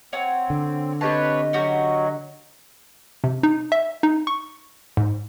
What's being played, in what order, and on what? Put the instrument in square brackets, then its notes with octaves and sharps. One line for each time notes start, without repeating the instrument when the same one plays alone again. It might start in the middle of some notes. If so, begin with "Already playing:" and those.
[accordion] C4 [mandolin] C#5 F#5 G#5
[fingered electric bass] D3
[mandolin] C4 G4 A5 [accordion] B4 C#5 [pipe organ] D#5
[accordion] F#3 [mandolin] C#4 F#4 G4
[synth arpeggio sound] C3
D#4
E5
D#4
C#6
G#2